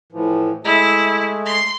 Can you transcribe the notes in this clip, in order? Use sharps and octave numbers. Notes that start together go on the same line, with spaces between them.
A2 E3 F3
G#3 A3 E4 G#4
C6